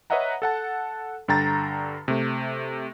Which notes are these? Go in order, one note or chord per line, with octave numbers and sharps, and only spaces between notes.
B4 C#5 D#5 E5 F#5 A#5
A4 F#5 A5
G2 D3 G5 A#5 A6
C3 A3